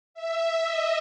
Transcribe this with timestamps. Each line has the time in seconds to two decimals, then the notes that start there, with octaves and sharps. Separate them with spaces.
0.14 E5
0.65 D#5